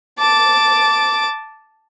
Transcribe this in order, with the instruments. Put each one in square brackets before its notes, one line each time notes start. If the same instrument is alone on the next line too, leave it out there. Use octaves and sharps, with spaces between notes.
[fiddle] A5 D6